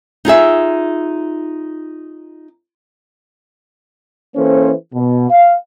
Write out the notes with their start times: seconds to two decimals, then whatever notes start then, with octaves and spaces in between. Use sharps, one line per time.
0.25 D#4 F4 G#4 E5
4.36 E3 A#3 C#4 A4 C5
4.94 B2
5.30 F5